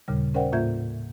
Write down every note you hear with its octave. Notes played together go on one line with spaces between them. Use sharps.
D#2 A#2 C#3 G3
C#4 A#4 C5 D5 F#5 G5
A2 A#3 F4 E5 G6 G#6